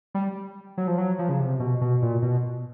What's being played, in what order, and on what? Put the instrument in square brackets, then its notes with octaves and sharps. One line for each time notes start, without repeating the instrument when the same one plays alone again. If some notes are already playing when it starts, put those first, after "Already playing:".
[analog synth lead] G3
F#3
F3
F#3
F3
C#3
C3
B2
B2
A#2
B2